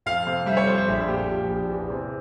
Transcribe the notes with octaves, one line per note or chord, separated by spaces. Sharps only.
F2 F5
C3
G3 E5
C#5
F2 C5
C5
A#1 E5
A#2 G4
F3
A#1
E2
C3